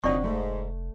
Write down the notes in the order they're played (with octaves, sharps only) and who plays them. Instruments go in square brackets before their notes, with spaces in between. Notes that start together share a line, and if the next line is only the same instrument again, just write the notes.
[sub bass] F1 [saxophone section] A#2 F#3 D#4 [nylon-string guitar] D3 C4 [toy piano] D5 C#6
[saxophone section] G#2 [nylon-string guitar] A3